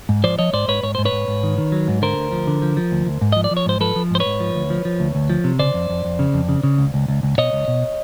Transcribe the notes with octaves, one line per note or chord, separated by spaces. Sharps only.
G#2
F3 C5 D5
F3 C#5 D#5
G#2 C5 D5
G#2 B4 C#5
G#2 C#5
G#2 C5
B4 C#5
G#2
G#2
D#3
D#3
F#3
G#2
D3 A#4 C5
D2
F3
D3
F3
F3
D2
D2
G#2
F3 D#5
D5
F3
C#5
G#2 C5
F3 A4 B4
F3
G#2 C5
B4 C#5
G#2
F3
D2
F3
F3
D2
D2
F3
C3
C#3 C5 D5
F2
F2
F2
C#3
F2
C#3
C#3
C#2
C#2
C#2
C#2
B2 C#5 D#5
C#2
B2